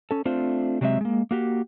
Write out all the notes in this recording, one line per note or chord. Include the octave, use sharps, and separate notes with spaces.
C#4 A4
A3 C4 D4 F4 C5
C3 F#3 G#3 C4 E5
G#3 A#3
A#3 F#4 G4